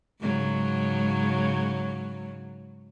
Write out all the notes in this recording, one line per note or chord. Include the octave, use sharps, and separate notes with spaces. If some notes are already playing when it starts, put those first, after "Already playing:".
G#2 C#3 F#3